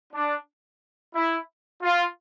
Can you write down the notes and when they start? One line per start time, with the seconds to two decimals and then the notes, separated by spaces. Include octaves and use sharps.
0.13 D4
1.14 E4
1.82 F4